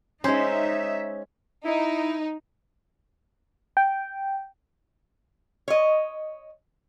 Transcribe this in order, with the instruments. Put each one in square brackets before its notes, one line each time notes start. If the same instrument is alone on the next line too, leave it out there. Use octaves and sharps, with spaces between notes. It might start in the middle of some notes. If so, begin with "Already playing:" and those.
[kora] G#3 C5 [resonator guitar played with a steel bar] C#4 [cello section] D#4 E5
[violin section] D#4 [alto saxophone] E4
[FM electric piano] G5
[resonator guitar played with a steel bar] C#5 D#5